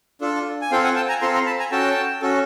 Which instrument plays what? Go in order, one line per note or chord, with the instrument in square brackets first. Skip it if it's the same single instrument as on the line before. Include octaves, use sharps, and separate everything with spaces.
[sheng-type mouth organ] D4 F4 A4
G#5
C4 F4 A4 F5 G5
F#5 G#5
G5 A5
G#5 A#5
C4 F4 A4 A#5 C6
A#5 C6
A5 B5
G#5 A#5
C#4 F#4 A4 G5 A5
C#4 F#4 A4